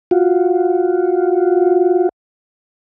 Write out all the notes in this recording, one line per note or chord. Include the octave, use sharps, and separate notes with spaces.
F4 F#4